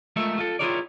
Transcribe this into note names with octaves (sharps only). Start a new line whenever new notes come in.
G#3 A3 F4 A4 A#4 E5
F4 A4
E4 F4 G#4 A#4 C#5 D5